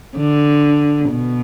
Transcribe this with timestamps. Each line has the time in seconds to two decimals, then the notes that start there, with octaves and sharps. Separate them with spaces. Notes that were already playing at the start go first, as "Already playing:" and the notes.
0.16 D3
1.11 B2